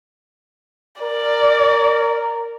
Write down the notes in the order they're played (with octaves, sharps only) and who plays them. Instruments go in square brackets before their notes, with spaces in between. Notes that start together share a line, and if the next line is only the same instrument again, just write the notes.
[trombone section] A#4 [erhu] D5